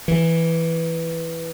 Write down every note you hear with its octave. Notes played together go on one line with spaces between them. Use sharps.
E3